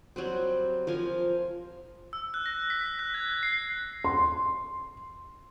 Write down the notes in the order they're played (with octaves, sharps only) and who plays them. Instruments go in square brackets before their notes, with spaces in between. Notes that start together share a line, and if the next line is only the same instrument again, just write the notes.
[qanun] F#3 G3 C4
F3 A#4 F5 G#5
[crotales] E6
F#6
A#6
B6
F#6
G#6
C7
[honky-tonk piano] C6